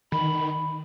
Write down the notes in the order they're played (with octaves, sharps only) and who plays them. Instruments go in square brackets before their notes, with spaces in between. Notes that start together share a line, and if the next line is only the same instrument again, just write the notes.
[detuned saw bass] D#3 [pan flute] B5